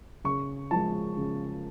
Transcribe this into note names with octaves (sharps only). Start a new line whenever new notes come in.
C#3 C#6
F3 G#3 A5
C#3